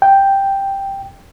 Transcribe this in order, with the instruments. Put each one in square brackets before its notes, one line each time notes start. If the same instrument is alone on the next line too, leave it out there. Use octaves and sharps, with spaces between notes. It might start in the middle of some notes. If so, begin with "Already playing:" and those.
[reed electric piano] G5